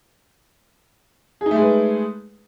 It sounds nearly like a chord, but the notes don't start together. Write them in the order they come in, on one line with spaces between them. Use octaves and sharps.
G#4 D#4 A3 G#3 B4